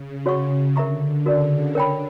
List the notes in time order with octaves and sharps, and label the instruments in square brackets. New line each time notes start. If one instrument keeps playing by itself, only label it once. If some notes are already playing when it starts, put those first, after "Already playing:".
Already playing: [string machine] C#3
[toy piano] F#4 C#5 F#5 C#6
[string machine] D3 [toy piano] A#4 E5 A#5 C#6
[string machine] C#3 [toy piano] F#4 A#4 D5
[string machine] D3 [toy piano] A#4 C#5 G5 B5